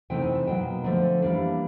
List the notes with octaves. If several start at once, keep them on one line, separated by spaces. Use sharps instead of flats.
C3 E3 A3 C4 D#4 G5
G#5
A5
B2 F#3 A#3 G5
D3 F3 A3
E3 G3 A#3 D4